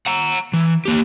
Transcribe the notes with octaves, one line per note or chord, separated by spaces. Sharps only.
F#5 A#5
E3
A#3 G4